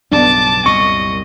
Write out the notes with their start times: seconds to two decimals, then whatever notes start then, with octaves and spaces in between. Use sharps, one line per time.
0.12 B1 G2 C#3 B3 D4 A5 D6
0.66 C2 F#2 A#2 D#5 C#6